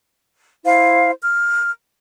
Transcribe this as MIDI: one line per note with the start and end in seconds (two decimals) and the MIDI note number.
0.64 1.11 64
0.64 1.11 72
0.64 1.11 77
1.20 1.69 89